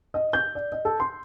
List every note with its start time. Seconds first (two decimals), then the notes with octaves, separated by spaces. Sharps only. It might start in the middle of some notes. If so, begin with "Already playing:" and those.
0.14 D#5
0.33 G6
0.55 D5
0.72 D#5
0.85 A4
1.00 C6